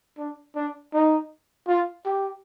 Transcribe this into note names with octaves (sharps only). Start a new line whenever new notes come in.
D4
D4
D#4
F4
G4